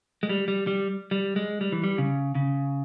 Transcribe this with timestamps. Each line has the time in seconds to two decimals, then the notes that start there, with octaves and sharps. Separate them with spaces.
0.23 G#3
0.29 G3
0.48 G3
0.67 G3
1.11 G3
1.36 G#3
1.61 G3
1.72 E3
1.84 G3
1.98 C#3
2.35 C#3